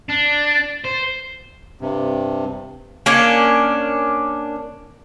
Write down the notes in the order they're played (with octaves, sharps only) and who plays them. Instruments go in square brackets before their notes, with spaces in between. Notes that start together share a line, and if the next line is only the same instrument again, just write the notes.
[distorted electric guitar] D4
C5
[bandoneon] G2 C3
[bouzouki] A#3 C#4 D4